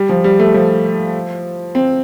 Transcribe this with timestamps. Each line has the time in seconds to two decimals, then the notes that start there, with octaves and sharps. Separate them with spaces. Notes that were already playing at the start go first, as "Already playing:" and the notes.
Already playing: G3
0.09 F3
0.24 G3
0.40 A3
0.54 F3
1.75 C4